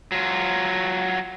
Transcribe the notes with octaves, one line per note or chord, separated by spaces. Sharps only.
F#3 F4